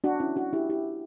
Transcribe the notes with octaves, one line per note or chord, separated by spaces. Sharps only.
D4 F#4
C#4 E4
D4 F#4
E4 G4
E4 G4